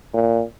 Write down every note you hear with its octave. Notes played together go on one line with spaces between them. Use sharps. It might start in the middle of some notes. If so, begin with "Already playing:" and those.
A#2